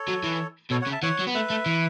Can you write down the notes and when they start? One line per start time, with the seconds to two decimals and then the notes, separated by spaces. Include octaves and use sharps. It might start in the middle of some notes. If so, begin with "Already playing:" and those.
Already playing: A4 C#5
0.08 F#3
0.24 E3
0.71 B2 A4 C#5
0.81 C#5 F#5
0.87 C#3
0.92 E5 A5
1.02 E3 C#5 F#5
1.19 F#3
1.27 B3
1.34 A3 B4 E5
1.50 A3
1.66 E3